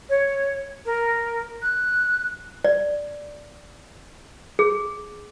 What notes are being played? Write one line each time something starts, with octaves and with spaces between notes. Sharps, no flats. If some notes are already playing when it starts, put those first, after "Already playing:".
C#5
A#4
F#6
D5
G#4